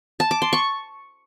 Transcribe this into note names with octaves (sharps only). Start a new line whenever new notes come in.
A5
D6
C6
C#6